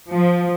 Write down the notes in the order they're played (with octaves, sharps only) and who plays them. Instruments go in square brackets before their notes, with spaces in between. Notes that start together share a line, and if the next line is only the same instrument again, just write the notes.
[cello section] F3